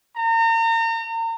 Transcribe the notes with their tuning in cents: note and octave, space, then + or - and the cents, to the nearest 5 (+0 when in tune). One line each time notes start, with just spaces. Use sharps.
A#5 -35